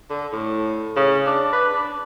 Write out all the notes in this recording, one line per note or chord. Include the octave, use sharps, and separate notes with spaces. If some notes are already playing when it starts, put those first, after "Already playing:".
D3
A2
C#3
D4
B4
D4